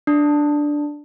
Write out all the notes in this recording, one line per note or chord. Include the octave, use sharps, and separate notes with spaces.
D4